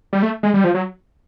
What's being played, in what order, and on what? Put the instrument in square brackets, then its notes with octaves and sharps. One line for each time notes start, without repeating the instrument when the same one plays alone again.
[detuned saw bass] G3
A3
G#3
G3
F3
F#3